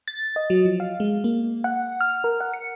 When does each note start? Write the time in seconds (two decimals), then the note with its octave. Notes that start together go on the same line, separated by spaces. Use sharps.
0.08 A6
0.36 D#5
0.50 F#3
0.65 F3
0.80 F5
1.00 G#3
1.24 A#3
1.64 F#5
2.01 F6
2.24 A#4
2.40 F#5
2.53 C#7